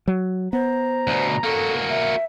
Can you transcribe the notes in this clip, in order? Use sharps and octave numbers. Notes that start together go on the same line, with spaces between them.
F#3
B3 C5 A#5
D2 B2
A#3 F#4 A4
E5